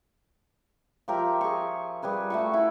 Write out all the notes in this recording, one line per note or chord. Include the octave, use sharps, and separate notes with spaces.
F3 G4 A#4 E5
G#4 C#6
G3 G#4 B4 C#5
A3 F#4 C#6
E4